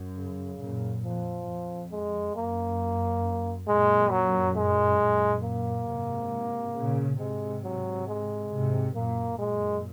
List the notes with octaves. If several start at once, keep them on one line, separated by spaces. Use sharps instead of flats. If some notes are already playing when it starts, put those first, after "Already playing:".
Already playing: F#2
C#3
F#2 A#2
F2 F3
F2
G#3
F#2 A#3
F#2 A#2 G#3
F#3
G#3
F#2 A#2
A#3
G#2 C3
A#2 C#3
G#2 C3 G#3
F#3
G#3
G#2 C3
F#2 A#2 A#3
F#2 A#2 G#3